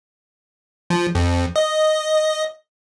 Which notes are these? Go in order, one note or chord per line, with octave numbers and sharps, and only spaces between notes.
F3
F2
D#5